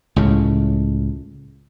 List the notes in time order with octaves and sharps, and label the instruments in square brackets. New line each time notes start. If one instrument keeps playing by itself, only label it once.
[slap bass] C#2 A2 C#3